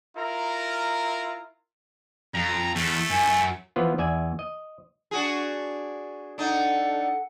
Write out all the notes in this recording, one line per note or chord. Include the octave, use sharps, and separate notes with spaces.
E4 F4 A#4 A#5
F2 A#5
E2 A3
F#2 G#5
E3 F3 B3 F4
E2 D5 E5 G#5
D#5
D4 F#4 G#4
D4 D#4 A4 F#5